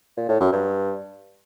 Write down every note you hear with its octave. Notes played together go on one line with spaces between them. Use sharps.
A#2
A2
F#2
G2